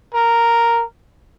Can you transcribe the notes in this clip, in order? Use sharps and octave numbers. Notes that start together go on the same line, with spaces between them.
A#4